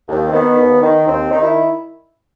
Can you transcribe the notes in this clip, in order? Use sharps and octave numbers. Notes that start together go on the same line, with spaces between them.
D#2
C4
D#3 B3
D#2
D#3
D#2 C4
D#3 D#4
E4